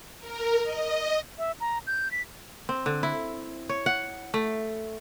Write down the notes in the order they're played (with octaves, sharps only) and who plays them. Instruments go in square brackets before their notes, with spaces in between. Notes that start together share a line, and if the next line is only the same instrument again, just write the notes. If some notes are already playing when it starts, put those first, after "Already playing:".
[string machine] A#4
D#5
[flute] E5
A#5
G6
B6
[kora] C4
D3
E4
C#5
F#5
A3